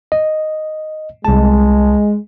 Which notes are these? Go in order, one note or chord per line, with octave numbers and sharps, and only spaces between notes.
D#5
C2 G#3 A5